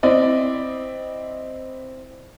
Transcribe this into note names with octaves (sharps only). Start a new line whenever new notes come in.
C4 E4 D5 D#5